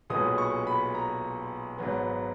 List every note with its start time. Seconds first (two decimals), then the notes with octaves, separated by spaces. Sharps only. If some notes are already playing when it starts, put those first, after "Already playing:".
0.10 B1 A#2 G#3 B3 D#6
0.38 C#6
0.67 B5
0.95 A#5
1.78 G#1 G#2 F#3 B3